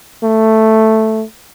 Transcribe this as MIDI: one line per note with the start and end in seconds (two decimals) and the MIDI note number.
0.23 1.23 57